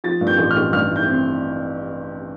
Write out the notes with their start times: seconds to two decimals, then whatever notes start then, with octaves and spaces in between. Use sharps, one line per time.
0.04 F3 A6
0.21 G2
0.27 G6
0.38 A1
0.51 F6
0.56 A1
0.73 G2 F6
0.91 E4 G6
1.07 C4